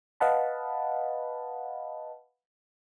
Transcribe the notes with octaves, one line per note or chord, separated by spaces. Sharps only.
B4 D#5 F5 F#5 A5 B5